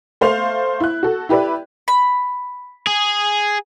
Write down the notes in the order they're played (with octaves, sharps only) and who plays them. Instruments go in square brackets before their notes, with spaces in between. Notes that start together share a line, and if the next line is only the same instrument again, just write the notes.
[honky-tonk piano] A3 C5 F5 C6 F7
E4 F#6
F#4 A4
E4 G4 B4 D5 E5
[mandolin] B5
[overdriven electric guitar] G#4